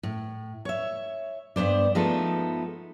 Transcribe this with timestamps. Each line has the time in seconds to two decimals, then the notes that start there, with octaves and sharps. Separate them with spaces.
0.03 A2
0.65 C#5 E5
1.56 G2 B3 C5 D5
1.95 F3 G#3 A3 B3 D#4 A4